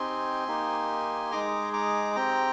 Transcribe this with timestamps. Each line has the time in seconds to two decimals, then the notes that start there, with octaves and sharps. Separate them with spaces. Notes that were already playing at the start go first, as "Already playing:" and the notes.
Already playing: C4 D#4 G4 G#5 C6
0.48 A#3 D#4 G4
1.31 G#3 D#4 G#4 A#5 D6
1.73 A#5 D6
2.16 C4 G4 G5 A#5